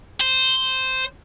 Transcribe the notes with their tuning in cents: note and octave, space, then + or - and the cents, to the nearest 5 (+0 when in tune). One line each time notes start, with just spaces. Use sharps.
C5 -5